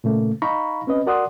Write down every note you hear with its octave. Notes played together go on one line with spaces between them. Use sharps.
A#2 C#3 A3 A#3
D#4 F5 A#5 B5 C#6
C4 C#4 B4 D#5
F#4 A#4 D5 F#5 C6 D#6